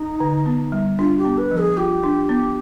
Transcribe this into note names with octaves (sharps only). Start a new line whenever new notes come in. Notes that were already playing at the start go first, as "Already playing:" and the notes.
Already playing: D#4
D3
B3
G3
D4 F4
G4
B3
B4
F3
G#4
F4 G4
D4
B3